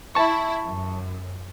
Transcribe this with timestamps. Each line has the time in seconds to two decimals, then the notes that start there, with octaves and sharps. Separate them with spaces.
0.15 E4 A5 C#6
0.66 F#2